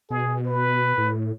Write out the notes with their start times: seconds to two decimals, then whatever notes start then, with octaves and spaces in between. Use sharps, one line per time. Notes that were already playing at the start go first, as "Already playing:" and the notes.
0.10 B2 G#4
0.46 B4
0.98 A2